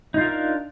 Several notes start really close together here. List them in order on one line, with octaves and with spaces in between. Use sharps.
D#4 F4 A#4 F5 D4